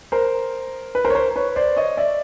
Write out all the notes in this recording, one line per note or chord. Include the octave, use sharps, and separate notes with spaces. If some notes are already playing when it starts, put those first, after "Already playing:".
A#4 C5
B4
A#4 C5
C#5
A#4 C5
B4 C#5
C5 D5
C#5 D#5
D5 E5